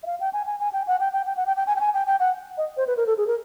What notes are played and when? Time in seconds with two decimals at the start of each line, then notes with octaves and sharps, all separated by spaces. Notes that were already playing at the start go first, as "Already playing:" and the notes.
0.03 E5
0.06 F5
0.20 G5
0.33 G#5
0.47 G#5
0.60 G#5
0.73 G5
0.87 F#5
1.00 G5
1.13 G5
1.26 G5
1.37 F#5
1.47 G5
1.57 G5
1.67 G#5
1.76 G5
1.80 G#5
1.94 G5
2.07 G5
2.20 F#5
2.57 D#5
2.77 C5
2.87 B4
2.97 A#4
3.07 A4
3.17 G#4
3.27 A#4